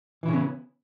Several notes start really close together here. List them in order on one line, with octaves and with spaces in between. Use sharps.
E3 E4 C#3 C#4 B3